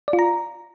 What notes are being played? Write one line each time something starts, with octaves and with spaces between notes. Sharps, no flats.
D5
F4
A#5